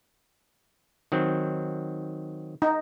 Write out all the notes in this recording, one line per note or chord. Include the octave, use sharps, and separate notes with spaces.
D#3 F#3 C4
D#4